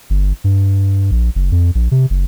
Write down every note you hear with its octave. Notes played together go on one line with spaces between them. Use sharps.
G1
G2
A#1
F#1
F2
A#1
C3
F#1